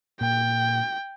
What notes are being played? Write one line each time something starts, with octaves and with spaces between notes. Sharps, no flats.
A#2 G5